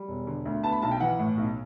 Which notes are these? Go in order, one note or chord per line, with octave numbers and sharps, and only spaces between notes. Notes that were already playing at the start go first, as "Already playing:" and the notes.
Already playing: G3
E1
D3
D2
B3 A5
B5
B1 A5
G5
E3 F#5
A2
B1